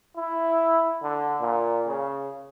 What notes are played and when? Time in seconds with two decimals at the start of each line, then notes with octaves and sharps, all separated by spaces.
0.17 E4
1.03 D3
1.41 A#2
1.88 C#3